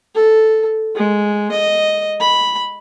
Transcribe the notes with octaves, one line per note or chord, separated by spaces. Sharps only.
A4
G#3
D#5
B5